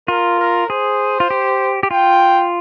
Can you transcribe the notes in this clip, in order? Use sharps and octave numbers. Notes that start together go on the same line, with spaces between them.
F4 A#4
A#4
G#4 C5
F4
G4
G4
F4 G5